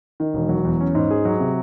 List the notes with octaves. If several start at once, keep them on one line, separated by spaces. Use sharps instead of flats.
D#3
E1
F#3
E2
C#4
G#2
G#4
F#3
C3